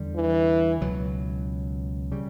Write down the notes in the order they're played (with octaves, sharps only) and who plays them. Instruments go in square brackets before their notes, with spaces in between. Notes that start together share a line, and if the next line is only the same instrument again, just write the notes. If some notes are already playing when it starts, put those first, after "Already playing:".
Already playing: [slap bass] E2 D3 G3
[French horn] E3
[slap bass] C#2 B2 F#3
C#3 G3